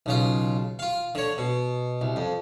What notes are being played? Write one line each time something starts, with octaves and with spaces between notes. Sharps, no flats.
B1 C#3 F4
F4 F5
D3 C#5
B2
C2
F2